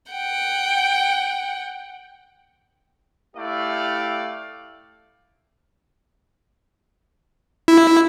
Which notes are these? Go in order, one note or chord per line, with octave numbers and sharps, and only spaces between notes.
F#5 G5
A3 E4 G4 D5 F5
E4